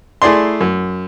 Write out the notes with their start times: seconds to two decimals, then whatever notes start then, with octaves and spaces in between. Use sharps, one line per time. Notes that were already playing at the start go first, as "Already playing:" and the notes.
0.22 A3 E4 G#4 D5 C6
0.61 F#2